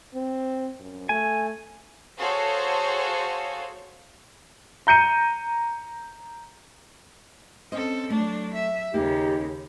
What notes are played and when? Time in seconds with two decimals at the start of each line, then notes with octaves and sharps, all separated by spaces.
0.14 C4
0.80 F#2
1.09 A3 G#5
2.19 F#4 G#4 A4 C5 C#5 F5
4.87 A#5 G6 C#7 D#7
7.72 C4 C#4 A4 C5 D#5
8.10 F#3 A3 D4
8.54 E5
8.94 D#2 C#3 A#3 D#4 G4